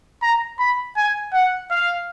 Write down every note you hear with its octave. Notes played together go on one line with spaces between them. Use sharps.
A#5
B5
G#5
F#5
F5